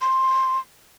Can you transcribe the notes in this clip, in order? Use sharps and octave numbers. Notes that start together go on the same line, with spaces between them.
C6